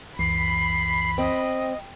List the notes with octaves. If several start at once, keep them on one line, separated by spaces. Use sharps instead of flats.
C#2 F#2 E3 B5 C7
C4 D#5